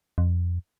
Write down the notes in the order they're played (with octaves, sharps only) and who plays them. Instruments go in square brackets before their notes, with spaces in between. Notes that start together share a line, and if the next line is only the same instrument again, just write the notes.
[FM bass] F2